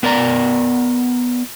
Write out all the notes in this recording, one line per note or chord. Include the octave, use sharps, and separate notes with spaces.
B3 A#4 D5 A#5